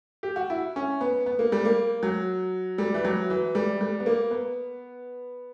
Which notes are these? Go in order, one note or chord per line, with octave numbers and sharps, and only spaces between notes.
G4
F#4
E4
C#4
B3
B3
A#3
G3
A#3
F#3
G3
E3
F#3
E3
G3
G3
B3
A#3
B3